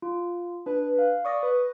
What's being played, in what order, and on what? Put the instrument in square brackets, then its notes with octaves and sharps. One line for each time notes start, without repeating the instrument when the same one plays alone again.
[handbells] F4
[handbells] D4 [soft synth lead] B4
[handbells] F5
[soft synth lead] D5 [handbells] C#6 D#6 A#6
[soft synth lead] B4